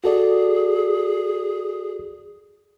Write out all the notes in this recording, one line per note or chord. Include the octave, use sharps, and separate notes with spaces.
F#4 G#4 A4 D5